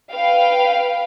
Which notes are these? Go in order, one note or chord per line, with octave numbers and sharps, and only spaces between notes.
B4 F5 G5